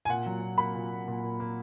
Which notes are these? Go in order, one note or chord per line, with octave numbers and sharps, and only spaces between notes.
G#5
A#2 F#5
F#3
A#2
A#3 B5
A#2
A#2
A#2
A#2
A#3